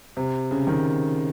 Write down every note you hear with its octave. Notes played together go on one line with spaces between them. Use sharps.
C3
C#3
D#3